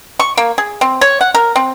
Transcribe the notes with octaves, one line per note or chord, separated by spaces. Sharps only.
C#6
A#3
G#4
C4
C#5
F#5
A#4
C4